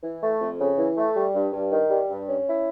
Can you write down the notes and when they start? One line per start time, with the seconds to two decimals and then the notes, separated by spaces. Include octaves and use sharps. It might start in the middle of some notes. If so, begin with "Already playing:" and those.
0.03 E3
0.22 A3
0.41 F2
0.59 C#3
0.78 E3
0.97 A3
1.16 G3
1.34 G2
1.53 G2
1.71 D#3
1.90 G3
2.09 G2
2.28 C#4
2.47 E4